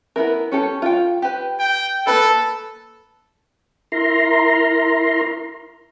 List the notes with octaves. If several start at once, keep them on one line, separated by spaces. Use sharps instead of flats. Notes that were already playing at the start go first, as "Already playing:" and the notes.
B3 E4 A#4
C#4 G4 A4
F4 G5
G4 B4
G5
A#3 A4 B4 B5
E4 A#4 A#5 C6